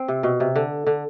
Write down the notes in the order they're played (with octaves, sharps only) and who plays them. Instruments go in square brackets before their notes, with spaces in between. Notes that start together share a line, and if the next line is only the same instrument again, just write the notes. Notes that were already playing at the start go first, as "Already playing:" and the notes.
Already playing: [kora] C4
C3
B2
C3
D3
D3